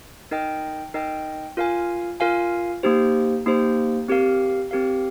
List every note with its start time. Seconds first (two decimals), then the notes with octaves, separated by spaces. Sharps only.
0.31 D#4 A#4 D#5 G5
0.94 D#4 A#4 D#5 G5
1.57 F4 A#4 F5 G#5
2.20 F4 A#4 F5 G#5
2.83 A#3 D#4 G4 C5
3.46 A#3 D#4 G4 C5
4.08 C4 G4 A#4 F5
4.71 C4 G4 A#4 F5